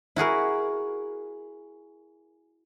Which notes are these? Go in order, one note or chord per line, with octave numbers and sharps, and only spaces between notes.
E4 F#4 G#4 A#4